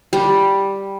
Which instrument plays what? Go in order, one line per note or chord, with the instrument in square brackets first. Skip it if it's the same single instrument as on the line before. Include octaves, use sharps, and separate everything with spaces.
[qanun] G3